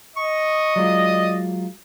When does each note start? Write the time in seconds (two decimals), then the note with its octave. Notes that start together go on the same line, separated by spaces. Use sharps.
0.16 D#5 C#6
0.76 F#3 G#3 F4 D5